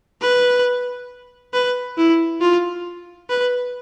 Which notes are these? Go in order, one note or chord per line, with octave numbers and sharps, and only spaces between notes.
B4
B4
E4
F4
B4